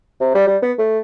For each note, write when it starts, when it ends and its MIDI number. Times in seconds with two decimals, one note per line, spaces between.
0.21 0.34 48
0.35 0.45 55
0.47 0.57 55
0.63 0.72 59
0.79 0.99 57